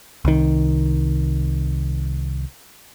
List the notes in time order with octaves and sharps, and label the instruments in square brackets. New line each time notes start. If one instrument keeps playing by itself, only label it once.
[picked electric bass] C2 D#3